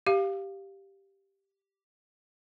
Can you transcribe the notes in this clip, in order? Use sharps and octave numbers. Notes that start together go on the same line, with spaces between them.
G4 F5